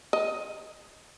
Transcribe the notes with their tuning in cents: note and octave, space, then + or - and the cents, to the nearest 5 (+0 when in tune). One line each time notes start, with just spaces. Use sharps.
D#5 +10